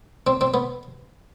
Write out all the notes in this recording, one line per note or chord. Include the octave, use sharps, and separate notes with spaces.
C4
C4
B3